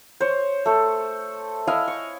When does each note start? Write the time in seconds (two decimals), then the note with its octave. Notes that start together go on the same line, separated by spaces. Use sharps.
0.20 C5 C#5
0.66 A3 A4
1.67 E4 D#5 F5 G#5
1.88 C#6